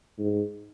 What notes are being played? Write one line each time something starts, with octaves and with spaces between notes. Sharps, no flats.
G#2